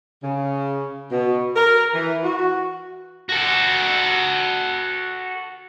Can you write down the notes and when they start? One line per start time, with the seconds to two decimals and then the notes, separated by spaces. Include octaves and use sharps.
0.23 C#3
1.12 B2
1.56 A#4
1.93 E3
2.24 F#4
3.29 F#4 A4